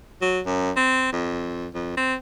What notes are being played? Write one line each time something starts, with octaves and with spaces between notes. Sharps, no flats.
F#3
F#2
C4
F2
F2
C4